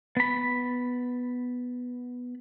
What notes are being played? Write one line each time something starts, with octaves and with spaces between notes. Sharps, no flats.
B3 B5